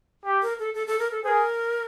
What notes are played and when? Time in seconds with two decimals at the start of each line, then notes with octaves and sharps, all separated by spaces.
0.25 G4
0.42 A#4
0.59 A4
0.74 A4
0.87 A4
0.99 A#4
1.11 A4
1.23 G#4 A#4 C5